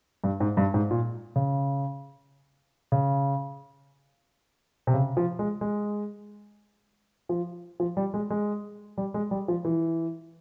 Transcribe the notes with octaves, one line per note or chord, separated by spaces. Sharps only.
G2
G#2
G2
G#2
A#2
C#3
C#3
C3
C#3
F3
G#3
G#3
F3
F3
G3
G#3
G#3
G3
G#3
G3
F3
E3